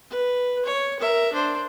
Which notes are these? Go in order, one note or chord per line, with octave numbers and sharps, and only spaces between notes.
B4
C#5
A#4 E5
D4 C5